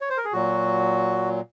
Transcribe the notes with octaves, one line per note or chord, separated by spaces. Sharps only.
C#5
C5
A#4
G#4
A#2 F#3 F#4